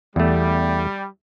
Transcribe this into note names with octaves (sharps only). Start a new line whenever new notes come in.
E2 G3 A3